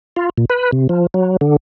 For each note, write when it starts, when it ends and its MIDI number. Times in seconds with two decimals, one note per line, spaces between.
0.16 0.30 65
0.38 0.45 46
0.50 0.71 71
0.72 0.87 48
0.89 1.07 53
1.14 1.37 54
1.41 1.56 50